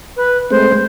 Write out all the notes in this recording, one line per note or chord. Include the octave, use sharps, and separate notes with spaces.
B4
G#3 A3 C4 C5